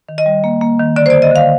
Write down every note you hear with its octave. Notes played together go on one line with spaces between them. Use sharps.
D#3
D#5
G3
A#3
A#3
D#3
D3 D5
C5
D3 D5
D#5
D3 F5